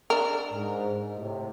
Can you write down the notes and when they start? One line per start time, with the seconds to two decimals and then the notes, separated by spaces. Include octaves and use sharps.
0.10 D4 A#4
0.53 G#2
1.18 A2 C3